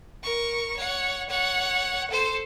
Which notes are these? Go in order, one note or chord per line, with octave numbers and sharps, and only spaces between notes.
A#4 C#6
C#5 F#5
C#5 F#5
A4 C5